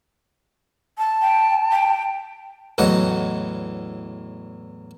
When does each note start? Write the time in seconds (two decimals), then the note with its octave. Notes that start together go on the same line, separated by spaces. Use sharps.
0.98 A5
1.22 G5
1.71 G5
2.78 E2 A2 F#3 D#5 F#5